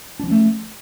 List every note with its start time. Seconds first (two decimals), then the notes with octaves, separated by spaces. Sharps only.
0.20 D4
0.23 F3
0.27 C#4
0.31 A3